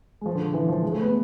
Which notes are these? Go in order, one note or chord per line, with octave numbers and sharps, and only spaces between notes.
G#3
F3
D3
E3
F3
G#3
A3
B3